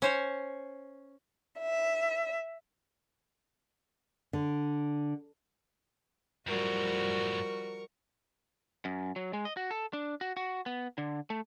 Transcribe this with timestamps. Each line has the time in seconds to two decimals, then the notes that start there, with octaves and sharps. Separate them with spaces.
0.02 C#4 C5 C#5
1.60 E5
4.33 D3
6.47 F#2 A2 F3 G3 F#4 A#4 C#6
8.85 F#2
9.16 F#3
9.33 G#3
9.45 D#5
9.57 F#4
9.71 A4
9.93 D4
10.21 F#4
10.37 F#4
10.66 B3
10.98 D3
11.30 A3